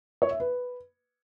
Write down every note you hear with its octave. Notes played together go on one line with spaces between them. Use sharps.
C#5
E5
B4